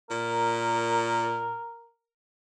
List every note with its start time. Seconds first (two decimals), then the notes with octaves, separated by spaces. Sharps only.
0.10 A#2 A#4